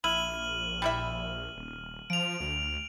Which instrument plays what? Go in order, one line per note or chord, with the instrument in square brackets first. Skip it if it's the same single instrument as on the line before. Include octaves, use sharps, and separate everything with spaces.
[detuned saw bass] A#1 [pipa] E4 [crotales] F6 D#7 F#7
[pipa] G3 E4 E5
[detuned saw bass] D#1
[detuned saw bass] F3 [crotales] D7 F7
[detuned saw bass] D2